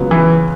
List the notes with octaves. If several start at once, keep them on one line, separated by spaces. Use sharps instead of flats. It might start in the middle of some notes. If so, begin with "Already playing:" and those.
Already playing: C#2 C#3 F#3 B3
E3